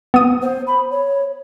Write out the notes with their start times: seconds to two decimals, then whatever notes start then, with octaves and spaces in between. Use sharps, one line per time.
0.14 B3 D#6
0.42 C5
0.67 B5
0.91 C#5